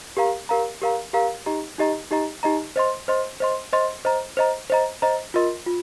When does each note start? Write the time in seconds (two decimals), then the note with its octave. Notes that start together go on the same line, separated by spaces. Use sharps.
0.17 G4 A#4 F5 A#5
0.49 G4 A#4 F5 A#5
0.82 G4 A#4 F5 A#5
1.13 G4 A#4 F5 A#5
1.46 D#4 G4 D#5 A#5
1.78 D#4 G4 D#5 A#5
2.10 D#4 G4 D#5 A#5
2.43 D#4 G4 D#5 A#5
2.76 C5 D#5 C6
3.08 C5 D#5 C6
3.40 C5 D#5 C6
3.73 C5 D#5 C6
4.05 C5 D#5 A#5
4.37 C5 D#5 A#5
4.70 C5 D#5 A#5
5.02 C5 D#5 A#5
5.34 F4 A#4 D#5 C6
5.67 F4